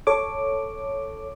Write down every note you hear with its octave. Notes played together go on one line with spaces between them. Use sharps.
A4 C#5 D6